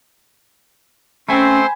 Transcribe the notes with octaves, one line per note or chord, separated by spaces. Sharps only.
A3 C4 C#4 C5 G5 G#5 B5